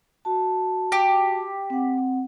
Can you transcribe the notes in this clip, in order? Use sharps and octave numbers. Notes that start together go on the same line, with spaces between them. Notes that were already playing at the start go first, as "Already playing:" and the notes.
F#4 A5
G4
C4 F#5